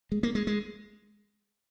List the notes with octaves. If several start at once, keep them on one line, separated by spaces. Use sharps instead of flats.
G#3
A#3
G#3
G#3